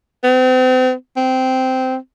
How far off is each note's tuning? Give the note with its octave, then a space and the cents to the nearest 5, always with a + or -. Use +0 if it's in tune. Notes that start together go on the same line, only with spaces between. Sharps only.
C4 -40
C4 -10